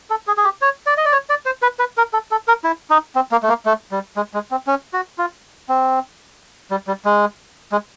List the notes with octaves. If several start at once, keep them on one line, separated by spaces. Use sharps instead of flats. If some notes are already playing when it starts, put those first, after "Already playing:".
A4
G#4
G#4
G4
C#5
D5
D#5
D5
C#5
D5
C5
B4
B4
A#4
A4
A4
A#4
E4
D#4
C4
A#3
A3
A#3
A3
G3
G#3
G#3
C4
C#4
F#4
F4
C4
G3
G3
G#3
G#3